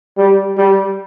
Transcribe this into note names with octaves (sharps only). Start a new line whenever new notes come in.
G3
G3